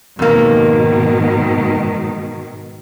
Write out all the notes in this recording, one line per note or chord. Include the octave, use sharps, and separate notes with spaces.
F2 G#2 B2 D#3 A#3